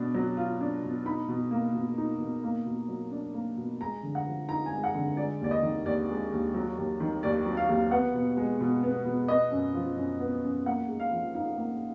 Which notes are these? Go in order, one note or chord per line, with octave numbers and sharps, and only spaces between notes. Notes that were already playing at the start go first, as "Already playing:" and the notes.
Already playing: B2 D4
F#3
F4
D4
B2
D#4 B5
B2
A#3
B2
D#4
B2
A#3
B2
F#3
D4
A#3
B2
G#3 A#5
D3
F#5
F3
D#4 A#5
G#5
G#3
F#5
D3
G#3 D5
D#2 D5
D#5
D#3
D#2 D5
G#3
D#2
F#3
D#2
D#3
D#2 D5
F#3
F5
D#2
B3 F#5
B2
G#3
B2
B3
B2
B3 D#5
F#2
F3
F#2
B3
F#2
A#3 F#5
G#2
F5
F3
D#4 F5
A#3